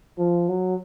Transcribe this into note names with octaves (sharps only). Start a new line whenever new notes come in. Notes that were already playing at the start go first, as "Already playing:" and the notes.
F3
F#3